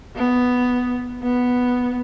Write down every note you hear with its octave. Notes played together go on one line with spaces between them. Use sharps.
B3
B3